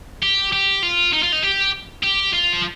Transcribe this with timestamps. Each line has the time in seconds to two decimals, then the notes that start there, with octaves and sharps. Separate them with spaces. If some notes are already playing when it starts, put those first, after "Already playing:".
0.23 G4
0.53 G4
0.83 F4
1.13 D#4
1.23 F4
1.32 D#4
1.43 G4
2.03 G4
2.33 F4
2.53 F3